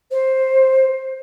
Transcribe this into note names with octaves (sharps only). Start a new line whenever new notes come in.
C5